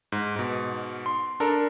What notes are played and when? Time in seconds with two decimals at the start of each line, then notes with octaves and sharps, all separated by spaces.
0.12 G#2
0.36 G#2 B2
1.06 C6
1.40 D4 A4 A#4